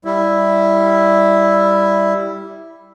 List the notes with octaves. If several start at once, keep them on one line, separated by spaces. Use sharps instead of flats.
G3 E4